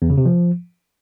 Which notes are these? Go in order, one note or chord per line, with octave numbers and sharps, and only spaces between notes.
E2
C#3
C3
F3